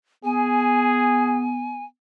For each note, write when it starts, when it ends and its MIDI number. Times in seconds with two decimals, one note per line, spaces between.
0.24 1.87 59
0.24 1.48 68
0.24 1.85 80